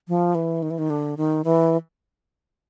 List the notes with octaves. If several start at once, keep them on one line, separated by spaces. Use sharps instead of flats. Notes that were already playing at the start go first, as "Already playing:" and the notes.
F3
E3
D#3
E3
D#3
D3
D#3
E3